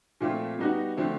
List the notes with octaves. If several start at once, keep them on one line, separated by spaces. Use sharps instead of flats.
A#2 F3 A3 C4 F4
G3 B3 D#4 F#4
D3 F3 A3 C4